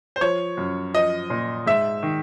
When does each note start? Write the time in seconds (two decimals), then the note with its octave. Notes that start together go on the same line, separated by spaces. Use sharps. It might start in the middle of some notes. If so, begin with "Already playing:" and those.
0.16 C5
0.21 F3 C#5
0.58 F#2
0.94 F3 D#5
1.30 A#2
1.66 G#2 E5
2.03 D#3